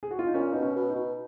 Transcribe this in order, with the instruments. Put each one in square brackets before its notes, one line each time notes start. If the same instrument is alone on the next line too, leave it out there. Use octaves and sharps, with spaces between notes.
[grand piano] G#4
F#4
F4
D#4
[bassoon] A#2 [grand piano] C#4
[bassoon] B2 [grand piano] D#4
[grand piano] C#4
[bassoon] B2
[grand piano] D#4
[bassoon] B2